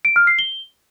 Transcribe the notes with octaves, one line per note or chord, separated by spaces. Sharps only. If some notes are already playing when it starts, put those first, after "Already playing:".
D7
F6
C7
G7